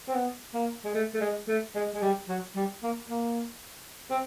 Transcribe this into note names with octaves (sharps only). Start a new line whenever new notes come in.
C4
B3
A#3
G#3
A3
A3
G#3
A3
G#3
G#3
G3
F#3
G3
A#3
A#3
C4